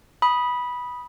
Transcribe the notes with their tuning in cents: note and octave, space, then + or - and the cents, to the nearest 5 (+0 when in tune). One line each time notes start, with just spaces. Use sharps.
B5 -10 D#6 +0